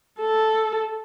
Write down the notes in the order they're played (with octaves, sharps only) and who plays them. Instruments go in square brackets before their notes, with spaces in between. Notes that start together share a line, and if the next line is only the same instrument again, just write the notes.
[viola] A4